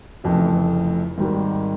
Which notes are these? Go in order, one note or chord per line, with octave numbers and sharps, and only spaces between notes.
F1 F2 C#3 E3 A3
G#1 G#2 D#3 G3